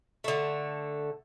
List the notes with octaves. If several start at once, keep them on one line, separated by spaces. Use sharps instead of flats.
D3 A3